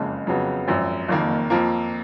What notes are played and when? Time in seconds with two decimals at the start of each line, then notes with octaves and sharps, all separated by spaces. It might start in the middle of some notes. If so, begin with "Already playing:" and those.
Already playing: F#1 F2 C#3 G#3
0.27 F2 C#3 F#3 B3
0.68 G#1 F#2 F3
1.08 F#1 F2 D#3 A#3
1.50 F2 F3 A#3